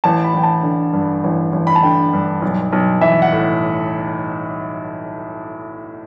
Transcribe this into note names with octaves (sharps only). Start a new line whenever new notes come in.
A1 A5
B5
A1 G5
A5
D3
G2
A1
A1
B5
A5
D3 G5
G2
B1
B1
E3 E5
F#5
A2